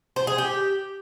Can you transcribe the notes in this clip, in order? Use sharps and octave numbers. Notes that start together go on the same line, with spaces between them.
C5
G#4
G4